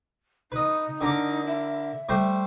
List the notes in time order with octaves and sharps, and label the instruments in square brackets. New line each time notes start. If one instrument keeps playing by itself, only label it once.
[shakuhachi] D#4 [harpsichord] B4 D#5
[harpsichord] D3 A#4 D6
[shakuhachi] E5
[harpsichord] G3 A3 C5